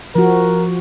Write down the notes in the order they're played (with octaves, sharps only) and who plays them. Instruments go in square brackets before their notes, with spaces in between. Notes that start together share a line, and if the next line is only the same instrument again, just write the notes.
[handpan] F3 F#4 [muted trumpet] A#4